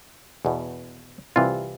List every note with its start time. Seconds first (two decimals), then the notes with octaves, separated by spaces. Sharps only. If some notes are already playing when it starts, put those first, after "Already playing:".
0.45 E2 B2
1.36 C2 C3 E3 F4